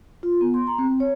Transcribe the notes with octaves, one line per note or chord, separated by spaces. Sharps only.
F4
B3
C6
A#5
C4
C#5